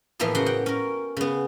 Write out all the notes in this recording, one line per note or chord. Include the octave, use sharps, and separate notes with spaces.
A2 E3 F3 A#3 B3 G#4
C#3 F#4 F#5 C6
F#5 G5
C#4 A#4
C#3 B3